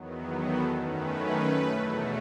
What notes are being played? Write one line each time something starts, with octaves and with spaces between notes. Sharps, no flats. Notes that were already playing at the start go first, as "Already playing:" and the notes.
Already playing: E2 D#3 F#3 B3
A4
F#2 D#3 A3 C#4 B4
E2 B2 F#3 A3